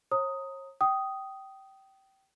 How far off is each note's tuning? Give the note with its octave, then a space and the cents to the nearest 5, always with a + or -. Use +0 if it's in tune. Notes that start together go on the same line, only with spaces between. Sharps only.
C#5 -40 A#5 -20 D#6 +5
G5 -20 D#6 +0